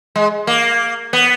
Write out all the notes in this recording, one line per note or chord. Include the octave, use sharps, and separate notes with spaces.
G#3
A#3
B3